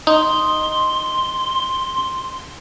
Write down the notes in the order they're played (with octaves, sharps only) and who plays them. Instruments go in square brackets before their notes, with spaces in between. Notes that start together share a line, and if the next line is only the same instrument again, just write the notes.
[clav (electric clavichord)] D#4 [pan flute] C6